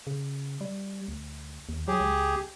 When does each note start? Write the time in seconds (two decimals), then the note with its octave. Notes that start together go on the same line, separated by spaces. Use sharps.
0.07 C#3
0.61 G3
1.08 D2
1.69 D#2
1.88 F#3 G4 G#4
2.00 C#2